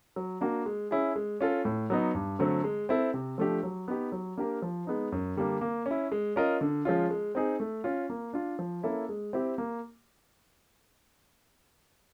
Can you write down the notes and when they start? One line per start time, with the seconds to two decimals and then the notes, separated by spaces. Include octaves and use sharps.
0.16 F#3
0.41 A#3 D4 F#4
0.66 G#3
0.91 C#4 E4 G#4
1.16 G#3
1.41 C#4 F4 A4
1.65 A2
1.90 F#3 B3 D#4
2.15 G2
2.39 D3 F#3 A3 C4
2.64 G#3
2.89 C4 E4 A4
3.14 C3
3.38 F3 A3 D4 G4
3.63 F#3
3.88 B3 D#4 G4
4.12 F#3
4.38 A#3 D4 G4 A#4
4.62 F3
4.87 G#3 B3 D#4
5.12 F#2
5.37 D3 G3 A#3 D4
5.61 A#3
5.86 C#4
5.91 E4
6.12 G#3
6.36 C#4 F4 A#4 D#5
6.61 D3
6.85 F3 G#3 C#4 F4
7.10 G#3
7.35 C4 D#4 G#4
7.60 A3
7.84 C#4 F4
8.10 A#3
8.33 D4 F4
8.59 F3
8.83 A#3 C#4 E4 A4
9.09 G#3
9.33 C4 E4 G4
9.58 A#3